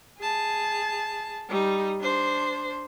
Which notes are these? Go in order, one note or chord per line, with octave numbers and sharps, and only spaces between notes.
G#4 A5
G3 D#4
D4 C5